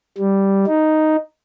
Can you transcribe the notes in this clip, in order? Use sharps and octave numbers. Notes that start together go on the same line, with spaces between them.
G3
D#4